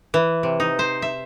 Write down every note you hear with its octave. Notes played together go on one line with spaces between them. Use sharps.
E3
C3
D#4
C5
E5